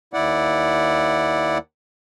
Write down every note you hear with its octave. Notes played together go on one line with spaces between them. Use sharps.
D#2 E4 D5 F#5